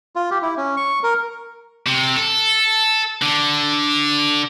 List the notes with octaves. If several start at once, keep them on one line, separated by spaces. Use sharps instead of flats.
F4
G4
E4
C#4
C#6
A#4
C3
A4
D3